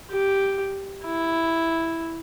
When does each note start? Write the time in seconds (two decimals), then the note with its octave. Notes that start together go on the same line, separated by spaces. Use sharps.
0.10 G4
1.05 E4